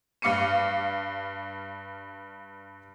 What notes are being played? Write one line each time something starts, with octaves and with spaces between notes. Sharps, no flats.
G2 F5 D6 C#7 D#7